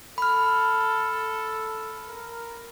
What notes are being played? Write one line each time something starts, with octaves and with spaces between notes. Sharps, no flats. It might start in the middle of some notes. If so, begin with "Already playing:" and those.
A4 B5 F6
A#4